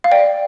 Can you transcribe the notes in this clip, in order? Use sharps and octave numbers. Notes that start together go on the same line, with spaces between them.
F5
D5 G5